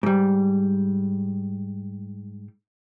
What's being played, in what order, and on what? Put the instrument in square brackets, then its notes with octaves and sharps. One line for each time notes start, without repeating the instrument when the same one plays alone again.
[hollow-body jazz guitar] G#2 G3